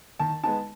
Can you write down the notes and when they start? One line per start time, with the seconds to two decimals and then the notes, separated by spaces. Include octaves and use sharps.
0.19 D#3 A5
0.43 G#3 B3 D#4 A5